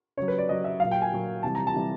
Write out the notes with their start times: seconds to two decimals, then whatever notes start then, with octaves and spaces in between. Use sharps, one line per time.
0.17 C#3 F#3 C#5
0.28 B4
0.38 D5
0.48 C#3 F#3 D#5
0.64 E5
0.80 A#2 F#3 F5
0.91 G5
1.02 G#5
1.12 A#2 F#3
1.43 C3 E3 G3 A5
1.55 A#5
1.67 A5
1.74 C3 E3 G3